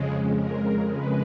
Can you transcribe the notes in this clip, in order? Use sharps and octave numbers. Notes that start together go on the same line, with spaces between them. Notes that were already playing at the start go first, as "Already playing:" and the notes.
Already playing: F2 C#3 G#3
F2 C#3 G#3 A#4
B4